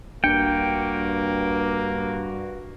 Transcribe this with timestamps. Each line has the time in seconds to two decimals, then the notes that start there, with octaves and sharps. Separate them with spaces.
0.24 A#1 G2 A#3 D4 F#4 G5 C#7